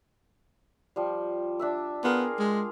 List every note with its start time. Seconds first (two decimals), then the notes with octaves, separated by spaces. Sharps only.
0.96 F3 G3
1.59 D4 E5 E6
2.04 B3 F4 G#4 A#4
2.39 G#3